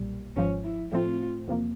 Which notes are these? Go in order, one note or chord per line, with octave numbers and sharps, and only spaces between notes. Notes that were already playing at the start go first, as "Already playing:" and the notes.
Already playing: B1 A#2 G3
G#1 G#2 F3 C#4
E4
A2 F3 A3 C4 F4
E2 C3 F3 A#3